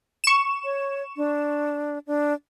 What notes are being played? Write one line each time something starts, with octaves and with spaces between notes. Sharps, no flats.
C#6 E7
C#5
D4
D4